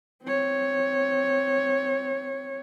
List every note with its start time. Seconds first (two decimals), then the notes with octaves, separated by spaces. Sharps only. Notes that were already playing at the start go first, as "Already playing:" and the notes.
0.23 C4 C#5